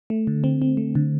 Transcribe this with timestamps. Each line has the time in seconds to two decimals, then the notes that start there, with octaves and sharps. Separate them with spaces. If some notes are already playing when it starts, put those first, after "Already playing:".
0.10 A3
0.27 D3
0.44 C4
0.62 C4
0.77 A3
0.95 D3